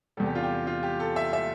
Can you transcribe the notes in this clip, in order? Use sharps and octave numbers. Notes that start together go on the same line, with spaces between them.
E2 C3 G3 A4
G4
F4
G4
F4
G4
A4
E5
E5